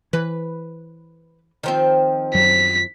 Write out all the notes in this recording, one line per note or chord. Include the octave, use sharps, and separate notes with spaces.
E3 B4
D#3 F3 C4
F#2 F#3 B6